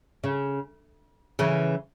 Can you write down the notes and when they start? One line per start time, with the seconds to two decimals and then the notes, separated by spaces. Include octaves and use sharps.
0.24 C#3
1.39 C#3 E3